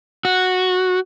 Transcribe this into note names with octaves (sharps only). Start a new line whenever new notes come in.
F#4